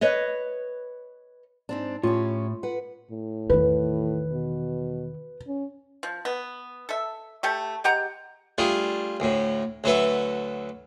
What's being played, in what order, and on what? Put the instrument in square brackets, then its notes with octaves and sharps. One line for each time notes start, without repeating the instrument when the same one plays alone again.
[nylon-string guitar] B4 C#5 D#5
[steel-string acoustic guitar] G#2 C4 D4
[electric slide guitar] A2 [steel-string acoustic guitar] C#4 G4 [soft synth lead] F4
[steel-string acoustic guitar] B4 F#5
[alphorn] A2
[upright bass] E2 D#3 [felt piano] B4
[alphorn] B2
C#4
[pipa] F3
B3
A4 E5
A3 G4 A4
G#3 G4 F#5 A#5
[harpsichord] G3 A3 D4 F4 G#4
D2 A2
D2 F#3 A4 B4 E5